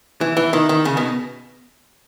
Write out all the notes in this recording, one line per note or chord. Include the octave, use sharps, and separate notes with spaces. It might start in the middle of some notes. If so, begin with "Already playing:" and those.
E3
E3
D#3
D#3
C#3
B2